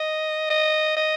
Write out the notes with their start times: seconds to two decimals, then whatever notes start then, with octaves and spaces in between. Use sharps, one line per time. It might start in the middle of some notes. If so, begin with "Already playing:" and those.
Already playing: D#5
0.50 D#5
0.96 D#5